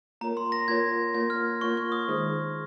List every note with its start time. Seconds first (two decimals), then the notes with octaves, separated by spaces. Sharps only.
0.21 A#3 F4 A#4 C#5 A#5
0.37 C6
0.52 A#6
0.68 A#3 F4 A#4 C#5 G#6
1.14 A#3 F4 A#4 C#5 G#6
1.30 F6
1.61 A#3 F4 A#4 C#5 C#6
1.77 C#6
1.92 D#6
2.08 D#3 G#3 D#4 G#4 C5